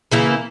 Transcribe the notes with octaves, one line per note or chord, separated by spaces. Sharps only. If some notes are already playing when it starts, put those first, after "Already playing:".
C#3 E3 A#3 E4